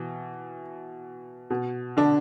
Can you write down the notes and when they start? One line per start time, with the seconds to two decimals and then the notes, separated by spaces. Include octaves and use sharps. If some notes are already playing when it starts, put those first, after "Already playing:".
Already playing: B2 E3
1.50 B2
1.97 D3 D4